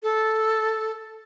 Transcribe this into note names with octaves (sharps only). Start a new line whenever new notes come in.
A4